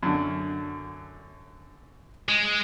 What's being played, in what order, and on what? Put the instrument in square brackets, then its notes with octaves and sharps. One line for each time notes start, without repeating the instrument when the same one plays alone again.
[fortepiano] F#2 D3
[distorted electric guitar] G#3